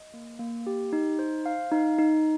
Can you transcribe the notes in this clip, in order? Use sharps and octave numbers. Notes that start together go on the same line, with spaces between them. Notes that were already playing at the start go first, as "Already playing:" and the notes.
Already playing: D#5
A#3
A#3
G4
D#4
C5
F5
D#4
D#4